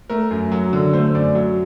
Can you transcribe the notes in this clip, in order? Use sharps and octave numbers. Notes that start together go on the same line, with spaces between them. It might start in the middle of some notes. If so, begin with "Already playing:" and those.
A3 A#4
F#2
F#3
D3
A3 C5
F#2 D5
F#3